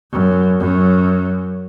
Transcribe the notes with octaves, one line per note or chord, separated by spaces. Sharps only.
F#2
F#2